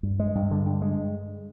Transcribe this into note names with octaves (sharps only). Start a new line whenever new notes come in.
G2
G#3
G2
D3
G2
G#3